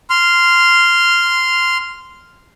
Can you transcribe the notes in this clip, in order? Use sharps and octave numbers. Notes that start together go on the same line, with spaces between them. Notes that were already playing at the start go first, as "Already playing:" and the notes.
C6 F6